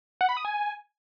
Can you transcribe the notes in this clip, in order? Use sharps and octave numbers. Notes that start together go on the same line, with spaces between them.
F#5
B5
D#6
G#5